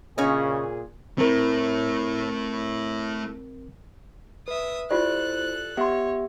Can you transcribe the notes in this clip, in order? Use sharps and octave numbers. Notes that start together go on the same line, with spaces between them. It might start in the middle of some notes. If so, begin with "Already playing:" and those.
A#2 C#3 C#4 G#4 C#5 D#5
A3 C4 E4 A#4
B4 E5 D#6
E4 F4 G4 A4 C5 D5 F#6
B3 G4 C#5 E5 F#5 C6